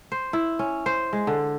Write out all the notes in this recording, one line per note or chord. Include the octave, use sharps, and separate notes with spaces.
C5
E4
C#4
C5
G#3
D3